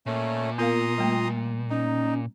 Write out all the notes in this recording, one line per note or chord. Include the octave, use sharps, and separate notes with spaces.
A#2 A3 C#4
B3 F4 A#4 F5 A#5 C6 D#6
G3 A3 A#3
C#4 D#4 A#5